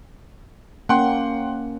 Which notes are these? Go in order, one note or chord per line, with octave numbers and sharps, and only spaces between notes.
A#3 C#4 F#5 G5 C6